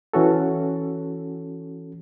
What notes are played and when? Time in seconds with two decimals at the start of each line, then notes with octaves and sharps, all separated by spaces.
0.14 E3 C#4 F#4 A4